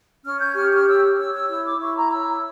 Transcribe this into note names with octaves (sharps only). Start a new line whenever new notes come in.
C#4 F6
G6
G4 F6
F6
C#5 E6
C#5 E6
E6
E4 E6
D6
E4 C#6
A#5
C#5 E6